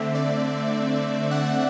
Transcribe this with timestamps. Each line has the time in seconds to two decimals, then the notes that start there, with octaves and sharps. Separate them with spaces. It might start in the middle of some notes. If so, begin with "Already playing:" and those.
Already playing: D3 A3 C4 E5
0.15 D5
1.31 F#5